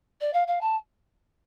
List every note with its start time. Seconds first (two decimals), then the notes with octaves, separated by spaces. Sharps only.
0.20 D5
0.33 F5
0.47 F5
0.61 A5